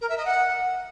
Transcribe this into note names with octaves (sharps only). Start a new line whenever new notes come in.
A#4
E5
D#5
F#5